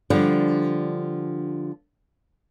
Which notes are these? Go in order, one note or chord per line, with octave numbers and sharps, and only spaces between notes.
D3 F3 G3 D4